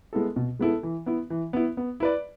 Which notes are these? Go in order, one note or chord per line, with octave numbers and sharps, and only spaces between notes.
G#3 B3 E4 A4
B2
G#3 B3 E4 A4
E3
B3 E4
E3
B3 E4
B3
E4 B4 D5